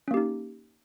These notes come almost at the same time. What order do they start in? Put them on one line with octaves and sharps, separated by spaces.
C#4 A#3 G4 D#4